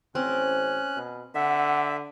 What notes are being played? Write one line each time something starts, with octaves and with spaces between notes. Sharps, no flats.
A1 C4 C#4 F#6
B2
D3 E5 F#5